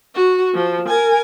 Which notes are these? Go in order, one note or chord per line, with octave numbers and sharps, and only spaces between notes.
F#4
F3
A#4 G#5